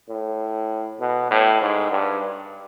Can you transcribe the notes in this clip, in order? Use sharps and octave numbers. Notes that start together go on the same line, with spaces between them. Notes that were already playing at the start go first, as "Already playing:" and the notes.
A2
B2
A2
G#2
G2